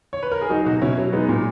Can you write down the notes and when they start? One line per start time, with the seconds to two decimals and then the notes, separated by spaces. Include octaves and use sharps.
0.13 C#5
0.23 B4
0.32 A#4
0.41 G#4
0.50 F#3 D#4 F#4
0.65 B2 D#4 F#4
0.82 B2 C#4 E4
0.98 F#3
1.13 G#3 B3 D#4
1.29 A#2